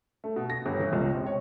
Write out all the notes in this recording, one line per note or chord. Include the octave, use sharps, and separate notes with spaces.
A3
B2
A#6
G1
E3
C#2
C3
C#5